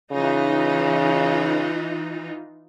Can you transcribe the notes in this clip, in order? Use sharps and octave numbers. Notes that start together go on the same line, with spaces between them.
C#3 E3 D#4 F4